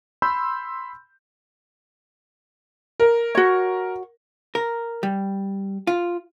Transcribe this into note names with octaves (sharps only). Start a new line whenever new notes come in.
B5 C6 E6 G6
A#4
F#4 C#5
A#4
G3
F4